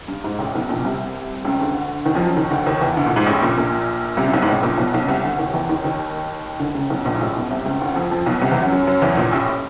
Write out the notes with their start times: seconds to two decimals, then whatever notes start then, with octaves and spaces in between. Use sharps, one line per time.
0.08 G2
0.24 G#2
0.39 A1 A2
0.54 B1 B2
0.69 A#1 A#2
0.79 B2
0.85 C2 C3
1.45 C#2 C#3
1.61 D2 D3
2.05 D#2 D#3
2.15 F2 F3
2.26 F#2 F#3
2.36 D#2 D#3
2.51 D2 D3
2.66 D#2 D#3
2.81 E2 E3
2.97 D2 D3
3.06 A#1 A#2
3.16 G#2
3.26 A1 A2
3.42 A#1 A#2
3.57 A#1 A#2
4.17 C2 C3
4.28 C3
4.33 B1 B2
4.42 G#2
4.48 A1 A2
4.63 A#1 A#2
4.78 B1 B2
4.94 B1 B2
5.02 C#3
5.08 C2 C3
5.23 D2 D3
5.38 D#2 D#3
5.54 E2 E3
5.69 D#2 D#3
5.84 D#2 D#3
6.60 D2 D3
6.75 C#2 C#3
6.90 B1 B2
7.05 A#1 A#2
7.15 G#2
7.21 A1 A2
7.36 B1 B2
7.51 C2 C3
7.66 C#2 C#3
7.81 D2 D3
7.96 F2 F3
8.11 F2 F3
8.26 B1 B2
8.42 C2 C3
8.51 E2 E3
8.62 F#2 F#3
8.72 F#2 F#3
8.87 F#2 F#3
9.02 E2 E3
9.17 A#1 A#2
9.32 A1 A2